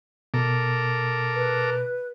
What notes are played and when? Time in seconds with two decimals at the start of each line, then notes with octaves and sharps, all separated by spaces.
0.34 B2 A4 A#4 D6
1.35 B4